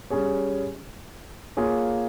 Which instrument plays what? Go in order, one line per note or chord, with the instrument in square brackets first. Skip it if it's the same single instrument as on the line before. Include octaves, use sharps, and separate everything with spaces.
[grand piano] G3 C#4 G#4 C#5
A#3 F4 G#4 C#5